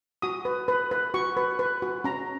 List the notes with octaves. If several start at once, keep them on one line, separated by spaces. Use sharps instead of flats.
F#4 D#6
B4
B4
B4
F#4 C#6
B4
B4
F#4
C#4 A#5